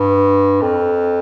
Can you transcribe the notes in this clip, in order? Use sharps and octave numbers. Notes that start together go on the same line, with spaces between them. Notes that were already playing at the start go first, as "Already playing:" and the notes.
Already playing: G2
F2